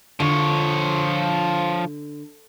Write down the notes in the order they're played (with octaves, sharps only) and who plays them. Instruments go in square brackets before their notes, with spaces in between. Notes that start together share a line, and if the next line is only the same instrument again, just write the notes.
[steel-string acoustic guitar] D3 [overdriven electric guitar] F3 C#5